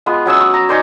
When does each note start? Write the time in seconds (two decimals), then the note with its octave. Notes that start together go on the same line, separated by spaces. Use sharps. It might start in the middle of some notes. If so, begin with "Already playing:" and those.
0.06 G#3 B3 F4
0.26 F#3 C#4 D#6 E6
0.40 C#6
0.54 A#5
0.69 C#4 D#4 C5 D5